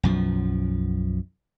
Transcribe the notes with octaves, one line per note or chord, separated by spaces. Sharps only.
B1 F#2 F3